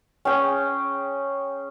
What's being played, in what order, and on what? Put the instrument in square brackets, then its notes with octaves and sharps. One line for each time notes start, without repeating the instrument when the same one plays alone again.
[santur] C#4 G#4 G5